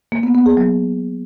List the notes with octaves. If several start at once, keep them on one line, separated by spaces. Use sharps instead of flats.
A#3
B3
B3
G#4
F#3